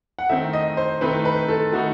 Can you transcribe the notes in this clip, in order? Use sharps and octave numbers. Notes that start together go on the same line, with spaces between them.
F#5
D#3 A3 C4 D#4 E5
D#5
C5
D#3 A3 C4 D#4 B4
B4
A4
D#3 A3 D#4 F#4